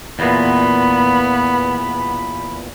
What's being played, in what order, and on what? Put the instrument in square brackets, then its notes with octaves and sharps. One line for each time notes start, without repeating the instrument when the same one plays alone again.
[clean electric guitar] E2 A#2 [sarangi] B3 [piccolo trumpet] B5